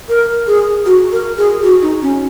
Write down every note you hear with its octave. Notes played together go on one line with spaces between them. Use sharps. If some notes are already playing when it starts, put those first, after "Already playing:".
A#4
G#4
F#4
A#4
G#4
F#4
D#4
C#4